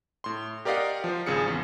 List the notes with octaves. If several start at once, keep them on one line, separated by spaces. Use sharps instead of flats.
A2 C6
G4 A#4 D5 D#5 F5 F#5
F3 C5
G#1 C#3 G#4 C#7
E2